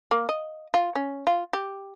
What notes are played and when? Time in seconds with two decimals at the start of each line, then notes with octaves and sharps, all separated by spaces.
0.11 A#3
0.29 D#5
0.74 F4
0.95 C#4
1.27 F4
1.53 G4